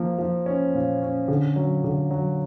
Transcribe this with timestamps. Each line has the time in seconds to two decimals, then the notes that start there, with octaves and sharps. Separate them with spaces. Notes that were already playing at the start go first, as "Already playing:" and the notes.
Already playing: F3 A#3
0.19 F3
0.46 C#4
0.74 A#2
1.02 C#4
1.28 D3
1.56 F#3
1.84 D3
2.11 F#3